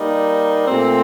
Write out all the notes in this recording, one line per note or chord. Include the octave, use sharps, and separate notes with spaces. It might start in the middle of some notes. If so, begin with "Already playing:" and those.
Already playing: G3 A#3 D#4
A#2 A3 C4